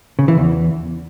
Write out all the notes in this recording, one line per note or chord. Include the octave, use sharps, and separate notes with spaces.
C#3
E3
E2